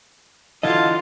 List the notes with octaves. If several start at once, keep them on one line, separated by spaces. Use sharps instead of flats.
D3 E3 F#3 F4 D#5 F5 A5